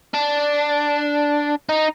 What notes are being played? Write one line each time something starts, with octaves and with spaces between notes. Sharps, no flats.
D4
D#4